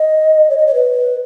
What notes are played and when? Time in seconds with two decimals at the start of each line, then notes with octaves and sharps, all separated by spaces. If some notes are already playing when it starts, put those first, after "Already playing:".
Already playing: D#5
0.50 C#5
0.58 D#5
0.66 C#5
0.74 B4